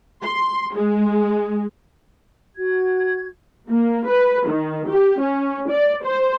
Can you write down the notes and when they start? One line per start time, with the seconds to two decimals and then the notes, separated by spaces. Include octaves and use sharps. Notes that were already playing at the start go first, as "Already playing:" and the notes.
0.23 C6
0.75 G#3
2.56 F#4 G#6
3.69 A#3
4.07 B4
4.47 D#3
4.87 G4
5.20 C#4
5.69 D5
6.03 C5